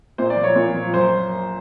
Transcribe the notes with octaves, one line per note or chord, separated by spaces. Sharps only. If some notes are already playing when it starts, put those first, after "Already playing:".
A#2 C5
D5
F3
C#5
A#2
F3
F#2 C5